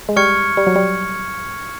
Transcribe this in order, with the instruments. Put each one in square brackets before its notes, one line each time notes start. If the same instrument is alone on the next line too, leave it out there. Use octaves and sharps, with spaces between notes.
[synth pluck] G#3
[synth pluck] G3 [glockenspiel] C#6 F6 G#6 C#7
[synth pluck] G3
F#3
G3